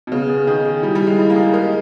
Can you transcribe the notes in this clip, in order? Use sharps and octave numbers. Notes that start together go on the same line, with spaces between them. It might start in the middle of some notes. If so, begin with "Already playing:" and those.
B2
C#3 B3
G#4
D#3 G#4
G#4
G3 E4
G3
G#4
G#3
E4
A#3
G#4
G#3 A#4